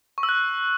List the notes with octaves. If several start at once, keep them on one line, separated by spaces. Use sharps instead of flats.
C#6
E6
F#6